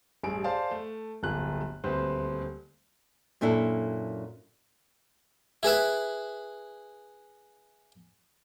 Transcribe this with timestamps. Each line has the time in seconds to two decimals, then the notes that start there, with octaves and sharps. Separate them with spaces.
0.23 A1 G2 G#4 D7
0.44 G#4 C5 D5 F5 A5
0.71 A3
1.23 D1 G1 F4 F#6
1.84 D#1 D2 C4 B4 C5
3.41 F#2 A#2 D4 E4 A4
5.63 E4 G#4 B4 E5